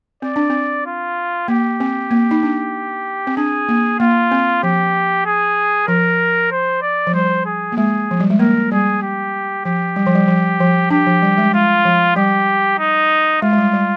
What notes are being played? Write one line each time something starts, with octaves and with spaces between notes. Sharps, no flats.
C4 D5
D4
C4
F4
A#3 G4
C4
A#3
D#4
D4
C4
D4 G#4
A#3
A#3 F4
C4
F3 G4
G#4
F3 A#4
C5
D5
F3
G3 C5
G#4
A#3
G#3 G#4
F3
G3
G#3
A#3 A#4
G3 G#4
G4
F3 G4
G3
F3
G3
F3
F3
D4 G4
F3
G3
G#3
G#3 F4
F3
G3 G4
D#4
G#3 F4
G#3
G3
G3